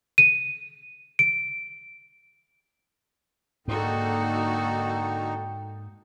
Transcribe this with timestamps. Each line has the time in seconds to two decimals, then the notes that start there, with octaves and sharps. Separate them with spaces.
0.18 D#7
1.19 D7
3.68 G#2 D3 A#3 D#4 F#4 A4 G5